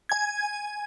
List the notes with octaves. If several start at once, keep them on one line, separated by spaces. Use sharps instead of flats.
G#5 G#6